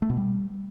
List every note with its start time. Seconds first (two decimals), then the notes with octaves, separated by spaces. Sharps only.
0.02 A3
0.10 B2
0.17 G3